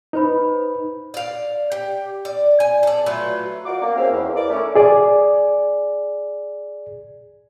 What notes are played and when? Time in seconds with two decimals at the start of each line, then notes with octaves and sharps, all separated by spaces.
0.13 D#4 B4 C5 B5
1.14 D5 F5
1.72 G4
2.25 D5
2.60 G#5
2.83 A4 D5
3.06 F#3 A3 F4 B4
3.66 F4 F#4 A#4 D5 D6
3.81 A#3
3.96 C4 C#4 G#4 C5 E5 F5
4.11 E2
4.35 A#4 D5 D6
4.49 A3 C#4 E4 A#4
4.75 G#4 D5